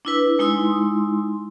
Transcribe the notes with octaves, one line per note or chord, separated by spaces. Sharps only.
D4 E4 B4
G#3 D#4 E4 C6 D#6